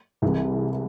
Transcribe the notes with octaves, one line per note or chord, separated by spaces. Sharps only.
C2 C3 E3 G#3